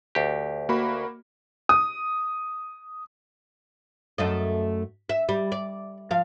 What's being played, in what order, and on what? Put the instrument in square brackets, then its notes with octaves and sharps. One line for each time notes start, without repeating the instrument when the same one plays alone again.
[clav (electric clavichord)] D2 G4
[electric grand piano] A#3 F#4 B5
[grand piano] D#6
[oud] F#2 A3 D#5
E5
G3
D5
F3 F5